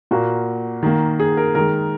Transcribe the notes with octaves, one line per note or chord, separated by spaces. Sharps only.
A#2 A#3 F#4
D#3 A#3
G#4
A#4
D#3 G#3 A#4